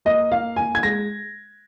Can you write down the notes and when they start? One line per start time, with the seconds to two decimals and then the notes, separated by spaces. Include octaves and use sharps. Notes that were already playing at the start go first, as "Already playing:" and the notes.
0.05 A#3 D#5
0.32 A#3 F5
0.56 A#3 G#5
0.75 G#6
0.83 G#3 A#6